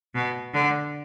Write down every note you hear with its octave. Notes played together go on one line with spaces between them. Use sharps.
B2
D3